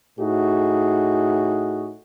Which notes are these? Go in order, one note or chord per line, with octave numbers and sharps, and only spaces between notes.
A2 D#4 F#4 G#4